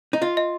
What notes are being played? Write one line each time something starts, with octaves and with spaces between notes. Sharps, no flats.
D#4
F4 D#5
D#5